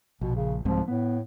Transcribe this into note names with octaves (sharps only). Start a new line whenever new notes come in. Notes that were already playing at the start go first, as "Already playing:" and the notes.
A#1 B2
C#3
C2 G#2 C3 F3
A2 B3